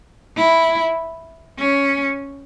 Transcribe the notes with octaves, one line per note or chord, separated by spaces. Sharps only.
E4
C#4